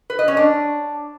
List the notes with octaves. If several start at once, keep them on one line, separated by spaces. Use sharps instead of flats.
B4
D#5
C#4
D4